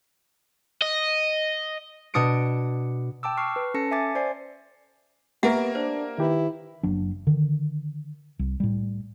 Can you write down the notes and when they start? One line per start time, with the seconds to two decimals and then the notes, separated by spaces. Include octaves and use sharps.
0.82 D#5
2.14 B2 D4 D#6 C#7 D7
3.23 G5 A5 D6 E6
3.37 C#6 F6 C7
3.56 B4
3.74 C#4 A4 A5 A#6 C#7
3.91 E5 G#5 D6 A6
4.15 C5 D5 G#5 C7
5.43 A#3 B3 G4 A#4 E5 F#5
5.75 D4 C5
6.18 D#3 E4 G4 B4
6.83 F#1 F#3 D4
7.27 D3 D#3
8.39 C2
8.60 A2 G3